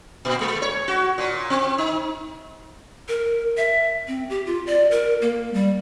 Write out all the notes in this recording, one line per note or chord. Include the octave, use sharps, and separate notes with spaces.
A#2
G#3
C#5
F#4
A#2
C4
D#4
A#4
E5
C4
G4
F4
D5
A#4
A#3
G3